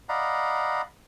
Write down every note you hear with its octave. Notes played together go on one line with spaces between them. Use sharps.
D5 D#5 F5 F#5 A#5 B5